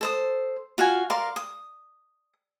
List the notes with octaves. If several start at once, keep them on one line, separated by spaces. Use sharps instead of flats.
A4 C5 D#6
F4 F#4 F5 G#5
A#4 D5 F5 C6
D#6